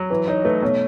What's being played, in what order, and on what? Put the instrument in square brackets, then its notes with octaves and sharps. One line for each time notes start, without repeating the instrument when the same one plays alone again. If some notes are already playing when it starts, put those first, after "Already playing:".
Already playing: [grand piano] F#3
[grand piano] E3 [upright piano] B4
[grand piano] D#4 [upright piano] C#5
[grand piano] A3 [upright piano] B4
[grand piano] B2 [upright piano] C#5